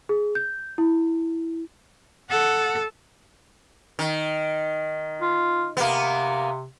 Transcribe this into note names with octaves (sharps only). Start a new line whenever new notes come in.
G#4
G6
E4
A4 F#5
D#3
F4
C3 A#3 B3